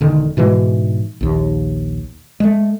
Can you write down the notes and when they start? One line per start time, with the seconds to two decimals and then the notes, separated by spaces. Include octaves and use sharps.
0.01 E1 D3 D#3
0.37 G#2 B2 E3 G#3
1.21 A#1 D#2
2.40 G#3 A3